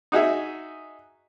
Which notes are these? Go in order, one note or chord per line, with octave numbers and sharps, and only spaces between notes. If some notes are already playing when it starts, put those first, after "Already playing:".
D#4 F#4 G#4 E5